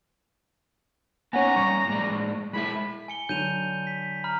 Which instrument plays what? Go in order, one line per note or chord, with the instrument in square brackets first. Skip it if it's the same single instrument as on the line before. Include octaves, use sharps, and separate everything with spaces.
[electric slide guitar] B3 C#4 [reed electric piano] C#5 F#5 G#5 [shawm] A#5
[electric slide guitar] G3 C#4 [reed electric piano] C#6
[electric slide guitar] A2 G#3 D5
[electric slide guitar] G#3 E4 E5 [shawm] B5
[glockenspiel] G#5 C#7 G7
[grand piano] D3 F#3 [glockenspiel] G6 D#7 F7
[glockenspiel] B6
A#5 B5 F6